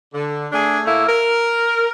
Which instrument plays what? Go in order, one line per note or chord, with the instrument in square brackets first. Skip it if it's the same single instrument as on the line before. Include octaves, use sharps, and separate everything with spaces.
[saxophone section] D3
A3 D4 G#4
A2 A3 A#3 E4
A#4